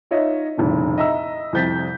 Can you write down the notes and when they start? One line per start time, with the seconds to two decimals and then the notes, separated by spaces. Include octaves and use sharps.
0.11 D#4 F4 C#5 D#5 E5
0.57 F1 C2 A#2 C#3
0.98 D#5 E5 A#5 E6
1.53 C2 F2 C3 G6 A6 B6